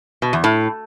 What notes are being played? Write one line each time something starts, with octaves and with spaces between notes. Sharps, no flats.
B2
E2
A2